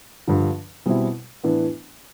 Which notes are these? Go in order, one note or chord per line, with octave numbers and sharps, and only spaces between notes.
G2 D3 F3
B2 G3 C4 E4
A2 E3 B3 D4